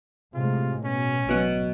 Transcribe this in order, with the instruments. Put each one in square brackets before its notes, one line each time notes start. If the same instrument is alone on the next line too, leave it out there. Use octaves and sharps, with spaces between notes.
[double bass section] A2 C3 G#3 [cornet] F4
[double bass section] B2 [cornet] C#4
[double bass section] A1 F#3 [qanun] B2 F#5